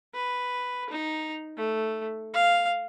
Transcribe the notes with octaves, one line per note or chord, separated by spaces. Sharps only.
B4
D#4
A3
F5